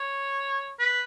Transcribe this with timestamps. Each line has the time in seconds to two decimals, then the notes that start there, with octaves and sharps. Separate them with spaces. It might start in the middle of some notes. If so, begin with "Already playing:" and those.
Already playing: C#5
0.79 B4